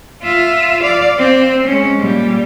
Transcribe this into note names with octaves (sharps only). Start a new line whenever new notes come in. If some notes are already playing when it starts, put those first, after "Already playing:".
F4 E5
D5 F5
C4
G#3 C#4
A#2 G3